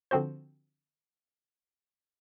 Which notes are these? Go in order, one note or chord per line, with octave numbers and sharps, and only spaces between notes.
D3 F3 C4 F#4 C5